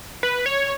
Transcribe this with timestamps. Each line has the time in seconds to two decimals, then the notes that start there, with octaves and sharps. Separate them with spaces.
0.23 B4
0.46 C#5